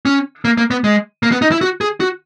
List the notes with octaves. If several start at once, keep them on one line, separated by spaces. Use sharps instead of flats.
C#4
A#3
A#3
B3
G#3
A#3
B3
D#4
E4
F#4
G#4
F#4